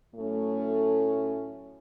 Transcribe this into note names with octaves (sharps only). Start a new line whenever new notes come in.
A2 F#3 A3 C#4